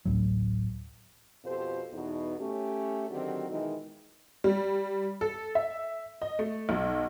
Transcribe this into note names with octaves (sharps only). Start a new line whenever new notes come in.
A1 D2 A2 F#3
F2 B2 F4 G4 A4 C5
E2 B2 D#4
A3 C#4 G4
D3 D#3 F#3 C4 F#4 G4
B2 D#3 E3 G#3 D#4
G3
A4
E5
D#5
A3
B1